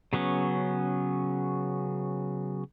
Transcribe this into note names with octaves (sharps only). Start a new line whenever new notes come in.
C#3 F#3 B3 C#4